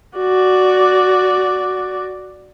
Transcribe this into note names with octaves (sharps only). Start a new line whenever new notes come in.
F#4 D5